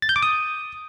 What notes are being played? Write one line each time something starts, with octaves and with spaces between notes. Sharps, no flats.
A6
G6
D6
D#6